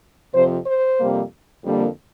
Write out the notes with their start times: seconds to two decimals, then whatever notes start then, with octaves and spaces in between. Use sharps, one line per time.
0.34 F2 C3 F3 C5
0.66 C5
0.98 F2 C3 G3 A#3
1.62 F2 D3 G3 A#3